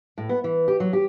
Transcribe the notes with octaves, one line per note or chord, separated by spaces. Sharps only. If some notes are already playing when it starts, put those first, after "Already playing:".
A2
B3
E3
G4
F#3
G4